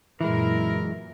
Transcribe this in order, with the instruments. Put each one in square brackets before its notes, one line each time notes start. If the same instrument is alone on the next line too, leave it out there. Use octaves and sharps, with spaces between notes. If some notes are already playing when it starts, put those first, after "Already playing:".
[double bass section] F#2 A#2 [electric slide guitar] E3 G#3 [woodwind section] E4 A#4